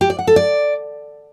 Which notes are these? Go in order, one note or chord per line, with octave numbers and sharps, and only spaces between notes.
G4
D5
F#5
A4
D5